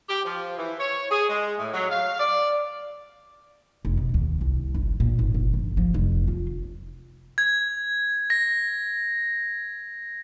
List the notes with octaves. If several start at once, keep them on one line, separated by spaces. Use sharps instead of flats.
G4
F3
E3
C#5
G#4
G#3
A2
F#3
F5
D5
F1
B2
D#2
C2
G1
A#2
G#1
G1
F3
F3
F1
F4
G#6
A#6